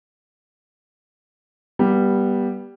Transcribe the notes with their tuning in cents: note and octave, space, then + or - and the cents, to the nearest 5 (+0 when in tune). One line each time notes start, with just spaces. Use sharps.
G3 +0 B3 -20